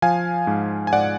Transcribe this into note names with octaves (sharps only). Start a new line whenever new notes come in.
F3 F5 G#5
G#2
G#5
G#2 D5 F#5